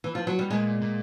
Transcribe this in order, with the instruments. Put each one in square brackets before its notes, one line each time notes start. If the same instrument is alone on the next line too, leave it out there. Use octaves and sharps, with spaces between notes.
[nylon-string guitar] E3
F3
F#3
G3
[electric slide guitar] A#2 [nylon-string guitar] G#3
[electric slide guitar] A#2